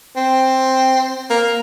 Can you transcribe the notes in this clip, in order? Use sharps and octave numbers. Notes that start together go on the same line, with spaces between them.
C4
A#3